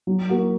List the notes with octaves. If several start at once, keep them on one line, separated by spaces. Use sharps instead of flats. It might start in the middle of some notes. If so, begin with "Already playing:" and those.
F#3
A#3 F#4